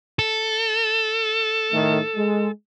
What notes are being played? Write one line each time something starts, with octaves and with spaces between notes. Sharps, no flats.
A4
A2 D#3 A3
G#3